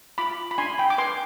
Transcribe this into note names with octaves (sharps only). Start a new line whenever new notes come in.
F4 B5 D6
B5
D4 G#5 C6
G5 B5
D6
B4 G#5 C6